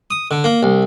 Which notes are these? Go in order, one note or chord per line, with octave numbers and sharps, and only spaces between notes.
D#6
D3
A#3
C2